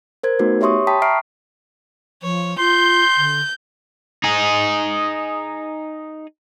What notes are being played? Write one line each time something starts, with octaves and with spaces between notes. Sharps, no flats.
A#4 C5 G#6
A3 B3 D#4 F#4 B4
G4 C#5 E5 C6 C#6 D#6
G5 A5 B5 D#6 B6
E5 A#5 C#6 F6 C7 D7
F3 C#5
F4 C6 G6
D3
D#4 G#4